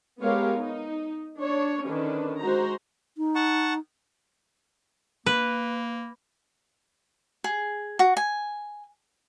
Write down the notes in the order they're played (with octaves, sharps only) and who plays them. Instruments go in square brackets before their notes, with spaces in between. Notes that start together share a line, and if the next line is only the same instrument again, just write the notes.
[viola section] G#3 B3 G4 A#4 C#5 F5
D#4
D4 C#5
D3 D#3 C#4 D4 B4
G#3 F#4 C5 A#5
[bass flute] D#4
[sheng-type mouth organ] F#5 A5 C#6
[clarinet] A#3 [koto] B4
[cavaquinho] G#4
F#4
G#5